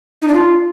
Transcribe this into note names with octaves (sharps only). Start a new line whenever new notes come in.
D#4
D4
F4